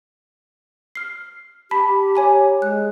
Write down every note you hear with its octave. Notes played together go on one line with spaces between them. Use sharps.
F6 C7
G4 A5 B5 B6
C#5 G#5 A#5
G#3 F#6